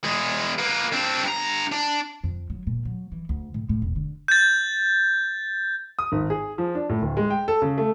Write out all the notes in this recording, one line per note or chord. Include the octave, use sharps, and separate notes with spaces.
E2 G#3
A#3 B4
C4 D4
G2 A#5
D4
F2
F#3
A#2
F#3
E3
D2
A2
A2
E1
D3
G6 A6
D#6
G#1
G#4
F3
D4
A2
D1
G#3
G5
A4
C#3
A3